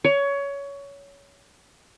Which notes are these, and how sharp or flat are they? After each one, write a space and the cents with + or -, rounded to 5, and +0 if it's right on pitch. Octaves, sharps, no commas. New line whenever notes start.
C#5 +20